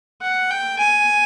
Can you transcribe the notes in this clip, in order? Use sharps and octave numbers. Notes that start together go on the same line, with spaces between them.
F#5
G5
G#5